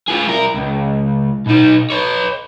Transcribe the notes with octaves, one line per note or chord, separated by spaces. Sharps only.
F4 G#4
C2 A#4
C#2
B2 D#4
B4 C#5